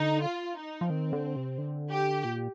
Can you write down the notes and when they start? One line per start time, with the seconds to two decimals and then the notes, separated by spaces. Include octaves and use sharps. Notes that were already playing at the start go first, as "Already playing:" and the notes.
Already playing: D3 D#4
0.23 F4
0.57 D#4
0.81 F3
0.90 D#3 C4
1.13 D3
1.36 C3
1.58 D3
1.91 G4
2.24 A#2